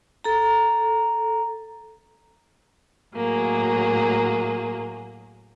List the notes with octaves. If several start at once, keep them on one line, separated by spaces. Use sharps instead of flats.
A4 A#5
A2 F#3 A#3 G#4